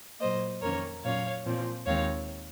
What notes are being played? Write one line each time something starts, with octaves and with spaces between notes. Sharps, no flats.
A#2 F#3 A#3 C5 D#5
F2 D#3 A#3 C#4 A#4 C#5
A#2 F#3 C#4 C#5 F5
A#2 F3 C4
D#2 D#3 G#3 C4 C#5 F5